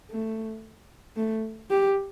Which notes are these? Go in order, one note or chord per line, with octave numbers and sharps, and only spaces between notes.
A3
A3
G4